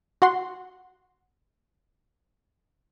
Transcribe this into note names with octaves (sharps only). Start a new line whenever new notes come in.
F#4 F#5 C6